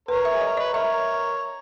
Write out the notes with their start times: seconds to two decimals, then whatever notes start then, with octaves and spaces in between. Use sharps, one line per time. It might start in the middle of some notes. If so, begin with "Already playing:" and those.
0.08 A#4 B4 C#5
0.25 E5
0.33 G#4
0.41 D#5
0.46 A#4
0.57 B4 D#5
0.73 A#4 C#5 E5